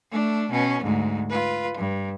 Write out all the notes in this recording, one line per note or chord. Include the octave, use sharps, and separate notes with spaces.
A3 D4
B2 C#4
D2 G#2
F4 B4
G2